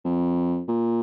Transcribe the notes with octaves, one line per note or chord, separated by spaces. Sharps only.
F2
A#2